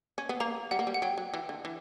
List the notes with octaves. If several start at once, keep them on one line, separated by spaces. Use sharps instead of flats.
C#4
B3
A#3 A#5
G3 F#5
A#3
G3
F#5
F#3 G5
F#3
E3
D3
E3